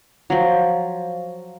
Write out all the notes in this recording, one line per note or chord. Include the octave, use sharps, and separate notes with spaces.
F3 F#3